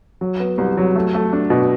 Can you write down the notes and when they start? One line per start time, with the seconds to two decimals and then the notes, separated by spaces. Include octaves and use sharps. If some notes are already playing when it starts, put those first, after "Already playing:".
0.21 F#3
0.40 B3
0.58 C2
0.77 F#3
0.96 A3
1.14 A3
1.33 D4
1.50 B2